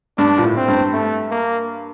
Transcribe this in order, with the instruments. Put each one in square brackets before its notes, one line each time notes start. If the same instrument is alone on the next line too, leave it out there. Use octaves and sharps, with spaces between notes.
[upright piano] G2 [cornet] D4
[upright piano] A#2
A2
[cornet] C4
[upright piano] G2
[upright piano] G2 [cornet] A3
[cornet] A#3